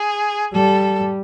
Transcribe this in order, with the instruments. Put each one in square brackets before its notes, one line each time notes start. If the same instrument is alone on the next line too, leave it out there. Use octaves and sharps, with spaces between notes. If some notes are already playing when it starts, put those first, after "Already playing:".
Already playing: [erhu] G#4
[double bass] G3 [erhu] A4